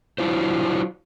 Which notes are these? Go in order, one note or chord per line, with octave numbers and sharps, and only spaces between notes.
F#3 D4 E4 F4 C5